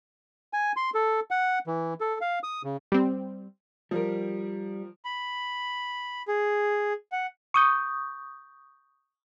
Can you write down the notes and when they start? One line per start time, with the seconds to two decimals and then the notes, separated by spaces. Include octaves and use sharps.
0.53 G#5
0.77 C6
0.95 A4
1.31 F#5
1.67 E3
2.01 A4
2.21 F5
2.43 D#6
2.64 C#3
2.92 G3 C4
3.91 F3 G3 A#4
5.05 B5
6.28 G#4
7.12 F#5
7.54 C#6 D#6 G6